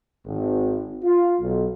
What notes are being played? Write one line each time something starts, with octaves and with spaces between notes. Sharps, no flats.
G#1
F4
B1